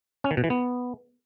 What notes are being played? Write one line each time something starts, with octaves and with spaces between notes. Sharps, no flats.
C#4
D#3
B2
E3
B3